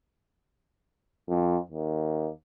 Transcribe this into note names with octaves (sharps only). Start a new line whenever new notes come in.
F2
D#2